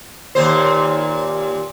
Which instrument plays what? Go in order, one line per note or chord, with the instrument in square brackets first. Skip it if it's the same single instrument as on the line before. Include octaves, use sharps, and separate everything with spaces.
[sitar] D#2 A#2 C5